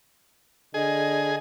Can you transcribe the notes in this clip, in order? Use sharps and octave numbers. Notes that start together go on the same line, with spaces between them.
D3 G#4 D#5